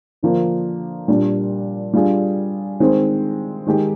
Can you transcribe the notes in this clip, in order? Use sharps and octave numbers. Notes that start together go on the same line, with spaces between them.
D3 F3 A#3 D4
A#2 G3 D4
G3 D4 F4 G#4
D#3 G#3 C4
D#3 G#3 D#4 G4